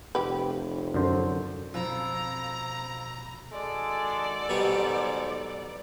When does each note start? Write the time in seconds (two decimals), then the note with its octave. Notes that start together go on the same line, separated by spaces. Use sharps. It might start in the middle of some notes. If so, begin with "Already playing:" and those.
0.15 F1 G4 B4
0.94 F#2 D3 C5
1.74 F2 B2 F3 A#5 B5 E6
3.52 D#3 G#3 F#4 A4 D5
4.49 G#2 B2 F#3 G3